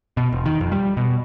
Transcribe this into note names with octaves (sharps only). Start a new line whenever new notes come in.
B2
E1
D#3
F2
G3
B2